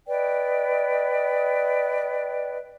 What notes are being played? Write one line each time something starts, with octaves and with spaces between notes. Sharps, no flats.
B4 D5 D#5 G5